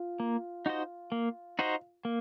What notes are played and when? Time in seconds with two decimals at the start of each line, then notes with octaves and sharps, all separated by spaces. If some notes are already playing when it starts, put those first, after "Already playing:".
Already playing: F4
0.20 A#3
0.66 D#4 F#4 C5 D#5
1.12 A#3
1.59 D#4 F#4 C5 D#5
2.05 A#3